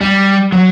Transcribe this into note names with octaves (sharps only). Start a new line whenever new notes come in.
G3
F#3